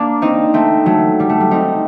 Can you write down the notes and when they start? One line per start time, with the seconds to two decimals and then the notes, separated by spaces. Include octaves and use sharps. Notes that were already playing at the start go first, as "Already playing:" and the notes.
Already playing: A#3 D4
0.22 C4 D#4
0.54 A3 C4
0.86 F#3 A3
1.20 G3
1.29 A3
1.40 G3
1.51 C4 D#4